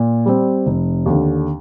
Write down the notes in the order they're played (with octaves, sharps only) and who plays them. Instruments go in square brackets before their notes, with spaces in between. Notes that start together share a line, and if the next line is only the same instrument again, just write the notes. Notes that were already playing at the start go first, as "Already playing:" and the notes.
Already playing: [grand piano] A#2
G3 C4
F1
D#2 D3